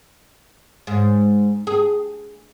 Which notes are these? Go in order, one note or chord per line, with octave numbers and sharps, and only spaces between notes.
G#2
G#4